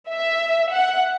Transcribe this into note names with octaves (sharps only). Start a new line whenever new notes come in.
E5
F#5